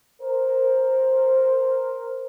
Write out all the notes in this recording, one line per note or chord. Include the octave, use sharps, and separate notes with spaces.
A#4 C5